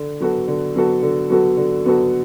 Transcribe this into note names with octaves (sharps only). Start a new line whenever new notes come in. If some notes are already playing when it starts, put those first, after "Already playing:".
Already playing: D3
F#3 B3 F#4 A4
D3
F#3 B3 F#4 A4
D3
F#3 B3 F#4 A4
D3
F#3 B3 F#4 A4